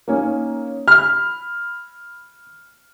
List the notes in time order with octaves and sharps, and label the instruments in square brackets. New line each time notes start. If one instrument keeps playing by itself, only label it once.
[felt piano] A#3 C#4 D#4
[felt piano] B5 [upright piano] F6